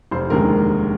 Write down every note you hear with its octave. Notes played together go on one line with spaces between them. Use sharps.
F1 C5
D#2 D3 G#3 A#4